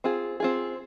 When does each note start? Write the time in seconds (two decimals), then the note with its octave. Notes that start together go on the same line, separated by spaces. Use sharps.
0.04 C4 F4 G#4
0.40 C4 F4 G#4